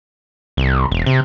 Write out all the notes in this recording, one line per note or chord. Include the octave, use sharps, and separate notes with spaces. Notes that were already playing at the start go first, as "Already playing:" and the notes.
C2
E1
C3